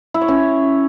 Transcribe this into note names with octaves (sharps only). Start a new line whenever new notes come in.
E4
C#5
C#4